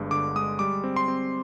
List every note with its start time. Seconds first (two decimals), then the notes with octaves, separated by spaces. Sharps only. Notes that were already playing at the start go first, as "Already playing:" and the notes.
Already playing: G1 G2 D3 G#3
0.11 D3 D6
0.36 G#3 D#6
0.59 G3 D6
0.84 C4
0.96 C6
1.08 C4